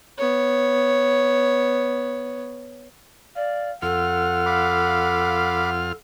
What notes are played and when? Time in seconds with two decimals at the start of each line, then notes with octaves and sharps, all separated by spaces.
0.17 B3 C#5
3.36 D5 F5
3.82 F2 F4 A4 F#5 F6
4.46 F5 B5 D6